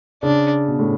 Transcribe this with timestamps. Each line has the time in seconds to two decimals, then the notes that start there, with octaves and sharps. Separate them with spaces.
0.23 C#3 D4
0.67 B2
0.79 A2